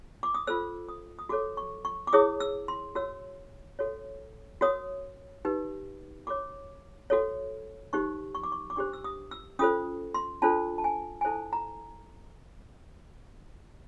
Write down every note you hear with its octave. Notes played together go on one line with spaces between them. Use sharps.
D6
D#6
F4 A4 C5 E6
D#6
D#6
F#4 A4 C#5 D6
C#6
C#6
D6
E4 G#4 C#5 D#6
E6
C6
F#4 A#4 C#5 E6
F#4 A4 C#5
F#4 A#4 C#5 D#6
D#4 G4 B4
F#4 A#4 C#5 D6
F#4 A4 C#5
D#4 G4 C5 C#6
C#6
D6
C#6
D6
D4 G4 C5 C#6
E6
D#6
E6
C#4 F4 A4 C5 D#6
C6
D4 F4 A4 C5 A5
A5
G#5
G#5
E4 A4 C5 A5
A#5